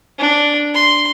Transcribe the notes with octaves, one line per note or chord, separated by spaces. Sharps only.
D4
C6